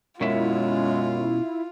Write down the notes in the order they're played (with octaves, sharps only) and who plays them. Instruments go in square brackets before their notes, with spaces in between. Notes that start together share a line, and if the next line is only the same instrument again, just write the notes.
[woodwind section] F#2 G#3 [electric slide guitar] B2 C#4 E5 [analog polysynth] E4 [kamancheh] F4